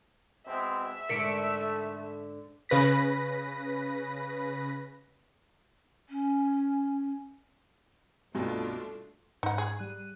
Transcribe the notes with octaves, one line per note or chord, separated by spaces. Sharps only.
B2 G#3 C4 E5
G#2 D3 A3 A#4 B6 C#7 D7
C#3 B4 A#6 B6
C#4
C2 G2 B2 A3 D4 F4
G#2 D#4 F#5
G#4
G3 F#6 D#7